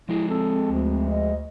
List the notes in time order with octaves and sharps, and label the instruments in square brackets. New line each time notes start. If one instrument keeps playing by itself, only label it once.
[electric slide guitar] F3 G#3 G#4 [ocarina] E4
[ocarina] C4 [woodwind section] A4
[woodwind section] D2
[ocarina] D#5